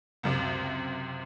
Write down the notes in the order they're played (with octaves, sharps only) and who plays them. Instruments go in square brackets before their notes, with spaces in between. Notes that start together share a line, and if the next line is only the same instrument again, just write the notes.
[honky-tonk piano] C#2 F#2 C3